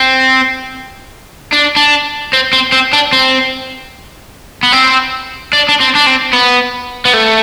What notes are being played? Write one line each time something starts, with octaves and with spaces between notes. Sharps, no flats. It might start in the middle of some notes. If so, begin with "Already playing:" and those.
Already playing: C4
D4
D4
C4
C4
C4
D4
C4
B3
C4
D4
D4
C4
D4
C4
B3
B3
A3